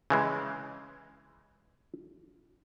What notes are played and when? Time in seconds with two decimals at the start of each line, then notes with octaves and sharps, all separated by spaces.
0.10 C#3 E3 G#3